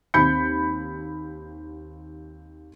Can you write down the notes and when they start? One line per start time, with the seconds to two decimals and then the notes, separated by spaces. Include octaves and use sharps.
0.14 D#2 C4 B5 G6 C#7